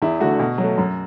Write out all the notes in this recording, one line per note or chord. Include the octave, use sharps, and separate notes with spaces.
E2 E4
D3 A3 F#4
B2
F#3
A3
F#2